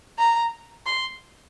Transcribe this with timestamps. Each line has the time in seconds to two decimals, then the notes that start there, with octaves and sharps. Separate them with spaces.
0.19 A#5
0.86 C6